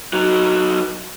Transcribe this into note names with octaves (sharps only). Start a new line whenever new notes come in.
F#3 D#4